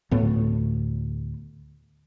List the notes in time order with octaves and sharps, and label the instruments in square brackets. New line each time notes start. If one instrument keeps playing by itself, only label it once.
[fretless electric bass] D2 A2 A3 B3